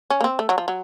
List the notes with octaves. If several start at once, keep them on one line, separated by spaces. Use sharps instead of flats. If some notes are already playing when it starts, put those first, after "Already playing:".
C#4
A#3
C4
A3
F#3
F3
F#3